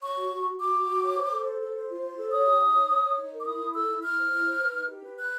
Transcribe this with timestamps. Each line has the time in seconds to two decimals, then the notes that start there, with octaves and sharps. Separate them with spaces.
0.02 C#5 C#6
0.17 F#4
0.31 F#4
0.45 F#4
0.59 F#4 D6
0.74 F#4
0.88 F#4
1.03 C#5
1.17 C5
1.31 A4
1.45 C5
1.60 A4
1.74 C5
1.89 F4
2.03 C5
2.17 A4
2.31 C#5 D#6
2.45 G4
2.60 D#4
2.74 C#5
2.88 C#5
3.03 C#5
3.17 D#4
3.32 A#4
3.38 D6
3.46 E4 D#6
3.60 E4
3.74 A4 E6
3.89 E4
4.03 E4 F6
4.17 C5
4.32 E4
4.46 C5
4.61 B4
4.74 D#4
4.88 G4
5.03 B4
5.17 B4 F#6